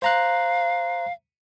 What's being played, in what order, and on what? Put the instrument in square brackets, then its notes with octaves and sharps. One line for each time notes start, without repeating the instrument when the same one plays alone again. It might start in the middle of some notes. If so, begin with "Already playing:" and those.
[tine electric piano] C5 A#5 F#6 [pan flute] F5